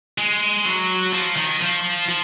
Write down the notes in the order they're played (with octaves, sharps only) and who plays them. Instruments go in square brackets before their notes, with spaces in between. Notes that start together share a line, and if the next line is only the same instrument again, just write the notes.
[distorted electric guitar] G#3
F#3
F3
D#3
F3
F3